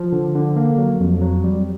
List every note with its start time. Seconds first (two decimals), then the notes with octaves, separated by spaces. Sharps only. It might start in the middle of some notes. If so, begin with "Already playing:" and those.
Already playing: F3
0.12 D3
0.35 D3
0.56 A#3
0.78 F#3
1.01 F2
1.21 F#3
1.44 G3